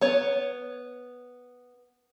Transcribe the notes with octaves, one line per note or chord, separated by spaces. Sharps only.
B3 C#5